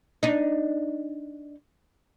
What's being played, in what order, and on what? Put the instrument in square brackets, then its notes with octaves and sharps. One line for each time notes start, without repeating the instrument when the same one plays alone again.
[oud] D4 D#4